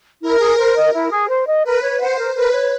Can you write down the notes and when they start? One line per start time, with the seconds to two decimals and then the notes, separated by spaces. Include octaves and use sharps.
0.22 E4 A#4
0.39 G#4
0.58 C5
0.75 D#5
0.93 E4
1.10 G#4
1.28 C5
1.46 D#5
1.64 A#4 B4
1.82 C#5
1.99 C5 F#5
2.17 A#4
2.35 A#4 B4
2.52 C#5